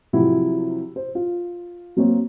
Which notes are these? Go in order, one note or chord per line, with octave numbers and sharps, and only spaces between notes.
C3 F3 F#3 E4 F#4
C5
F4
F#3 A#3 C4 C#5